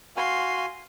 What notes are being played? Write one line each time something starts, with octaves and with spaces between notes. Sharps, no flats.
F#4 F5 G#5 C6